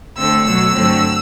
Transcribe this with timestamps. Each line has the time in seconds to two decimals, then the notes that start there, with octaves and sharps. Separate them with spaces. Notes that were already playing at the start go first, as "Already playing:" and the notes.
0.16 D2 D3 A3 C4 E6
0.45 B2 F#3 A3 E6
0.74 G2 D3 F#3 A3 C4